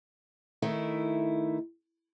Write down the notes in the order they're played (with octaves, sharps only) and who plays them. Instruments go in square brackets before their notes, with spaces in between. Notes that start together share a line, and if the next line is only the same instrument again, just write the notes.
[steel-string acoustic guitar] D#3 A3 E4